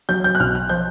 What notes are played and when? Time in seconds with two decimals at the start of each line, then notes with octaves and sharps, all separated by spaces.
0.09 F#3 G6
0.24 G6
0.35 F#6
0.40 B1 F6
0.55 F#6
0.69 F3 G6